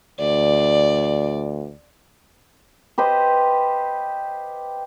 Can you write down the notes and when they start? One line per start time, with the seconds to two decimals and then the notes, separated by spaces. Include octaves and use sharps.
0.20 D2 D5
2.98 G4 B4 C5 D#5